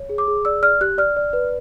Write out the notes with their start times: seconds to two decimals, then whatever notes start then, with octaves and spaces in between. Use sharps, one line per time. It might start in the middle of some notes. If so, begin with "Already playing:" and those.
Already playing: C#5
0.09 G#4
0.18 D6
0.28 G#4
0.45 D5 E6
0.63 D5 F6
0.81 G4 F#6
0.98 D5 F6
1.17 D5
1.33 B4